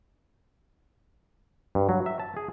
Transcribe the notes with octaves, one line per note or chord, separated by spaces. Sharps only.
G2
F#3
E5
A5
G#4